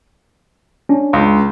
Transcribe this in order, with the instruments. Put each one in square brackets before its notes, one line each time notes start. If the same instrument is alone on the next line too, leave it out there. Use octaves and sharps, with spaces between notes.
[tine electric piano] C#4 D4
[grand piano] C#2